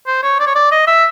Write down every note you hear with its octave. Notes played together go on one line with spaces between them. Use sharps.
C5
C#5
D5
C#5
D5
D#5
E5